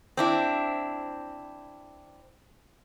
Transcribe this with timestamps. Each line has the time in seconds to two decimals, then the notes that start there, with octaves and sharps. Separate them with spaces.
0.17 C4 D4 E4